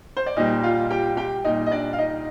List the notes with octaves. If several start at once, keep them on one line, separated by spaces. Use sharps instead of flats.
C5
D5
A#2 G3 D#4 D#5
F4 F5
G4 G5
G4 G5
A#2 G3 D#4 D#5
D#5
D4 D5
F5
D#4 D#5